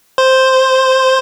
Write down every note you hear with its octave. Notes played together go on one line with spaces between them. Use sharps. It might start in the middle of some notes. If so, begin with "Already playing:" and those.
C5